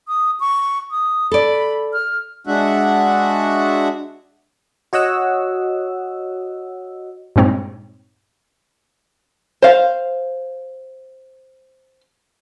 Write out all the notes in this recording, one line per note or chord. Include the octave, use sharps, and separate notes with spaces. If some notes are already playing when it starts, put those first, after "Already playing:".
D#6
C#6
D#6
A4 D5 B5
F6
G#3 D4 F#4 E5 F#5
F#4 C#5 D#5 F#5 E6
G2 A#2 G#3 C4 D#4 C#5
C5 F5